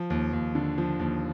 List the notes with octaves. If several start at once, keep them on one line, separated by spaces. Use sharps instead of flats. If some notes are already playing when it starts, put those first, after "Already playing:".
Already playing: F3
D#2
D#2
D3
F3
D#2